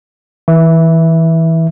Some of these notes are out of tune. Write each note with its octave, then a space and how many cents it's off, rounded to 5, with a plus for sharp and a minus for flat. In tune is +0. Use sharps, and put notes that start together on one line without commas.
E3 -25 E5 +0